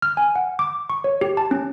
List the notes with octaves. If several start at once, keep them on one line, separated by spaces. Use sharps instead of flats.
F6
G#5
F#5
D6
C#6
C#5
G4
A5
C#4